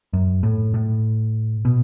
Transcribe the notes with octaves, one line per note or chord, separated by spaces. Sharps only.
F#2
A2
A2
B2